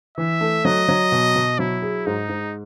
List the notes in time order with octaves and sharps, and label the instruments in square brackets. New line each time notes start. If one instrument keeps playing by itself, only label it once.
[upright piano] E3 [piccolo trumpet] E5
[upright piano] A3
[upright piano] F#3 [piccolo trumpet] D#5
[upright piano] F#3
B2
B2
[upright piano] F#3 [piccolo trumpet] E4
[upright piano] G#4
[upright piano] G#2 [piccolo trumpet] D#4
[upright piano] G#2